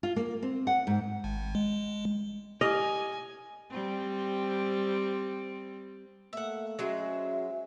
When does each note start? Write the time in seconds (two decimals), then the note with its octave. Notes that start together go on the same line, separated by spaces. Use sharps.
0.03 F4
0.16 A#3
0.42 C4
0.67 F#5
0.87 G#2
1.24 G#1
1.55 G#3
2.61 E4 G4 D#5 G#5
3.70 G3 C4
6.33 A3 A#3 E5 F#5
6.79 F#3 G#3 C#4 F#4 C5 E5